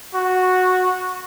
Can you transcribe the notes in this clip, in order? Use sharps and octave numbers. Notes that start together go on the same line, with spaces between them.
F#4